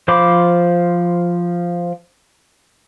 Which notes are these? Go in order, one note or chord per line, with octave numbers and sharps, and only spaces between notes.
F3 C5 F5 B5 D6